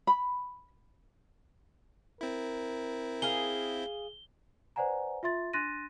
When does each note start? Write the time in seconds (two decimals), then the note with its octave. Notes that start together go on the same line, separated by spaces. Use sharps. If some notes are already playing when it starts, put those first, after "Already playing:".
0.07 B5
2.21 C4 E4 A#4
3.22 G#4 F5 G7
4.76 B4 C5 D5 F#5 G#5 A#5
5.23 F4 E5 C6 A6
5.53 D4 C6 F#6 A6 A#6 D#7